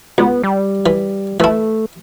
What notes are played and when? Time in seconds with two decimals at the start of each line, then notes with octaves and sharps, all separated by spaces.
0.18 C#2 B3
0.44 G3
0.86 E3
1.40 E3 A3 E4